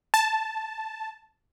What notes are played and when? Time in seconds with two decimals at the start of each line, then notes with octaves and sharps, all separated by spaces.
0.14 A5